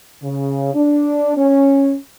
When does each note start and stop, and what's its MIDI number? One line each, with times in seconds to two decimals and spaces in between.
0.23 0.74 49
0.74 1.37 62
1.37 1.95 61